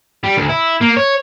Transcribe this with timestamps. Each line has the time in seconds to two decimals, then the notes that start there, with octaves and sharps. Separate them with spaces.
0.24 G3
0.37 D2
0.49 E4
0.81 A#3
0.97 C#5